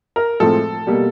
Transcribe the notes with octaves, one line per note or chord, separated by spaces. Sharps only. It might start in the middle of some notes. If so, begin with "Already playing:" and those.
A#4
A2 F3 G#3 C4 A4
B2 G3 A#3